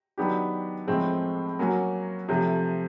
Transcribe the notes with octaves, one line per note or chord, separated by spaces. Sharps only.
D#3 F#3 B3 D4 G4
A2 F3 G#3 C4
F#3 A#3 C#4 F#4
C3 F3 A3